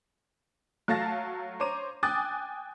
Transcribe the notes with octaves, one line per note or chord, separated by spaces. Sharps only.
F#3 A3 F5 A5 A6 A#6
C5 C#5 A#5 D6 D#7
G5 G#5 D6 D#6 F#6 A6